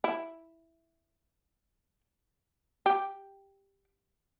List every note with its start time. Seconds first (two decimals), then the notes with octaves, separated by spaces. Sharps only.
0.04 E4
2.86 G4